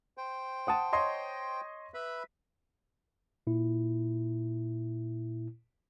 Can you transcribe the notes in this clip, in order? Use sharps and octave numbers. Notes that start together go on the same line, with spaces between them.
C5 G5
F#5 A5 D#6
C#5 D#5 C6
B4 E5 B5
A#2 E4